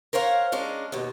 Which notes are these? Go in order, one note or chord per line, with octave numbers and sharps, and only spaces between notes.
A#4 C5 C#5 F5 F#5
G#3 C#4 D4 A#4
D#2 B2